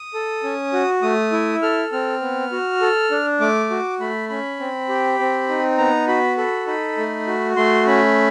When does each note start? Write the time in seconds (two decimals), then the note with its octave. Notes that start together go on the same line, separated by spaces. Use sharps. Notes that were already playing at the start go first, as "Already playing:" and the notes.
Already playing: D#6
0.14 A4
0.43 C#4
0.73 F#4
1.02 A3 D#6
1.32 E4
1.62 A4 F6
1.92 C4 F6
2.21 B3
2.52 F#4
2.81 A4
3.11 D4
3.40 A3 D6
3.70 F#4
4.00 A3 B5
4.29 C#4 B5
4.60 C4
4.89 G4
5.19 C4
5.49 D#4
5.78 B3 A#5
6.08 F#4 B5
6.37 A4 B5
6.67 D#4 B5
6.97 A3
7.27 F#4
7.56 A3 C6
7.87 C#4 B5